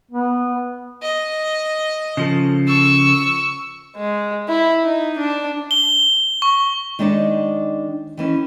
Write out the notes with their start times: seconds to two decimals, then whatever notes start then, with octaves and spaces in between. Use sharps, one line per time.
0.11 B3
1.02 D#5
2.17 C#3 F3 A4
2.67 C#6 E6
3.97 G#3
4.48 E4
4.85 D#4
5.18 D4
5.71 G7
6.42 C#6
6.99 D#3 G#3 D4 D#4 C#5 D5
8.17 D#3 E3 C#4